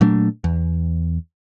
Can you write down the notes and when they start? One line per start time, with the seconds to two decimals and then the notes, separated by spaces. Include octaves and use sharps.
0.01 A#2 F#3 A3 D4
0.44 E2